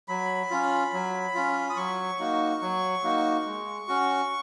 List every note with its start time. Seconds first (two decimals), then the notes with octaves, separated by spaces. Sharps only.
0.08 F#3 B5
0.50 C#4 F4
0.93 F#3
1.35 C#4 F4
1.70 D#6
1.76 F#3 C#6
2.19 A#3 D#4 F#4
2.62 F#3
3.04 A#3 D#4 F#4
3.46 G#3
3.88 C#4 F#4